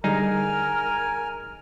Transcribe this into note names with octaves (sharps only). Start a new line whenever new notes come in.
D3 G3 D#4 G#4 A#4 G#5 F6